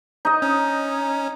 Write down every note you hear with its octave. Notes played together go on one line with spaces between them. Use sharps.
D#4 D#5
C#4